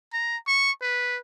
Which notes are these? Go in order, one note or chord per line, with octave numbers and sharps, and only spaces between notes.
A#5
C#6
B4